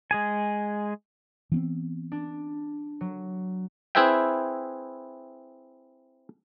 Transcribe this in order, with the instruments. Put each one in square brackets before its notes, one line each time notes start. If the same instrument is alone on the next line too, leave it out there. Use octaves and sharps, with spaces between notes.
[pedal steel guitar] G#3 G#4 G#5
[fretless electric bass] E3 B3 C4
[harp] D4
F#3
[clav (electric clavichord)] C4 E4 G#4 B4 E5 G5